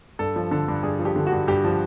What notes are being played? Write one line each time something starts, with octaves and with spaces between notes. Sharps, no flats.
G2 A4
F3
D3 A4
G2
G2 G#4
F3
G4
D3
F#4
G2
G2 G4
F3